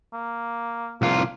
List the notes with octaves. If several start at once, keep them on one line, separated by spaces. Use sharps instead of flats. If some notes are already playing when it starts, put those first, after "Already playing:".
A#3
C2 A#3 F4